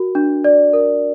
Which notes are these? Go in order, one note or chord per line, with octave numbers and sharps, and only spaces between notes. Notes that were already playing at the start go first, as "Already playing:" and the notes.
Already playing: F#4 A#4
D4
D5
A#4